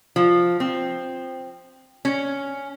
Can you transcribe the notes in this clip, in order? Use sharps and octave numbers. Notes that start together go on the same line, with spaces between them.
F3
C4
C#4